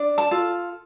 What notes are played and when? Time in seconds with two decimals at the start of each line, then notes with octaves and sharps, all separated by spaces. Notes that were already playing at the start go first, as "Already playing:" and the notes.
Already playing: D4
0.18 A5
0.31 F4 A4